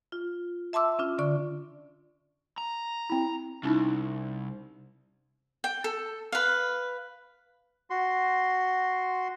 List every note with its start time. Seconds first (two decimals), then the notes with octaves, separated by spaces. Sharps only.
0.12 F4
0.73 E5 A5 C6 D6 E6
0.99 C#4 D4 F4
1.18 D3 D5 C#6
2.58 A#5
3.10 C4 E4
3.63 C2 C#4 D#4 E4
5.64 G5
5.84 A4
6.32 B4 F5
7.90 F#4 C6